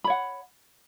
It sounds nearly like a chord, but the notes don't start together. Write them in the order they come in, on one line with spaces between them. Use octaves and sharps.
B5 C#5 F#5